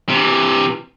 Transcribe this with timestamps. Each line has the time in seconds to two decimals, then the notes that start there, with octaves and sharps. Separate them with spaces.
0.09 C3 E3